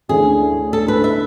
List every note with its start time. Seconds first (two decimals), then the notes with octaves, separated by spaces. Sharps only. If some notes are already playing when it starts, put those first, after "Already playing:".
0.09 D2 D3 A3 C#4 E4 G#4
0.73 A4
0.88 B4
1.04 E5